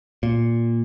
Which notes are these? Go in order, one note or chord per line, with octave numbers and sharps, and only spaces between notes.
A#2